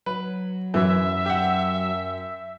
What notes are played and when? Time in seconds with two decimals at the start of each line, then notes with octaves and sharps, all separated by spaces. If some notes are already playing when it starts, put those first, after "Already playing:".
0.06 F#3 B4
0.74 F#2 E3 E5
1.26 G4 F#5